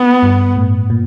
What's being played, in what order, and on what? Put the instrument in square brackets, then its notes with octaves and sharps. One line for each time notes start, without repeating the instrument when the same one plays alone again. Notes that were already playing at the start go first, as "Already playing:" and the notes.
Already playing: [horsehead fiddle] B3
[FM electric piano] G2
A2
A#2